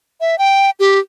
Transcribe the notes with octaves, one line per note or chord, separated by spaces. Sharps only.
E5
G5
G4